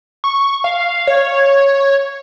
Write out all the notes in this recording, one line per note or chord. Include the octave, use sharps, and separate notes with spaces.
C#6
F5
C#5